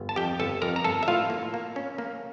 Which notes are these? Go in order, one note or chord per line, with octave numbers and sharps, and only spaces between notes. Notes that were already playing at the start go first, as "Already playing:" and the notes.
Already playing: G1
A5
F2 G4 G5
G1 A4 A5
F2 A#4 A#5
A#5
G1 A4 A5
E5
A2 F4 F5
A#3
A#3
C#4
A#3